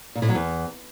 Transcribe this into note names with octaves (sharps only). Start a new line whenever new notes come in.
A#2
A2
F#3
E2